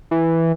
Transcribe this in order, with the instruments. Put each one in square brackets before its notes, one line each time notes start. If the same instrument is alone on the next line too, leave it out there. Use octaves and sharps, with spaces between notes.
[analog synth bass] E3